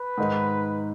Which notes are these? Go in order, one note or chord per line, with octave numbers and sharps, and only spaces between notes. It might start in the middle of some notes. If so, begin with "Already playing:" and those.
Already playing: B4
G#2 D#3 G#3 D#4